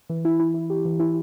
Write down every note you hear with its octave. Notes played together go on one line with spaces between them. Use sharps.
E3
E4
E4
E4
G4
E3
E4